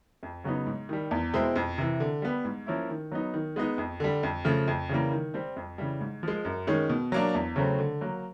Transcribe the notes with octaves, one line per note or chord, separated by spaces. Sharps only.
F2
C#3 F#3 B3 D#4
G#2
D#3 G3
E2
B2 G#3 C4 E4
F2
C3 E3
D3
G3 B3
G#2
F3 A#3 C#4 E4
D#3
F#3 B3 D#4
D#3
G#3 B3 D#4
F2
D3 G3
F2
C#3 F3 A3
F2
C#3 E3 G3 A#3
D#3
G3 C4
F2
C#3 E3 G3
G#2
F3 G#3
F#2
D#3 G#3 C#4
B2
F#3 A#3 D4
E2
C#3 F#3 A3 C4
D3
F#3 A#3